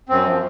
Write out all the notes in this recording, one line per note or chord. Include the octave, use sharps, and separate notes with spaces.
F#2 C4
F3